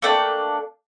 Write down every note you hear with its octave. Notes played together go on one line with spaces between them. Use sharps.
A3 A#3 D4 G5